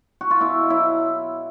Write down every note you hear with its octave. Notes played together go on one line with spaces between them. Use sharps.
F#4
F4
B2 E4
F#3 E4